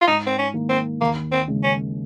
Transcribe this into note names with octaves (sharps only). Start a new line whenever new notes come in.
F4
G#2 D#4
C4
C#4
D#3 A#3
C4
D#2 A#3
C4
C#3 G#3
C#4